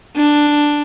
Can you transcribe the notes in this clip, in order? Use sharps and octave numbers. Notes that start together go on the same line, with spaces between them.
D4